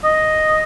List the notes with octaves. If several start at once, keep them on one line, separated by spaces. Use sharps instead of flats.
D#5